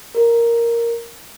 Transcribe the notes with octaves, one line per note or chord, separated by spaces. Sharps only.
A#4